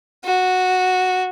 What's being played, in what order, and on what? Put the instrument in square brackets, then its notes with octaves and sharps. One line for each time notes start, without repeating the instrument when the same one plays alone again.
[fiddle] F#4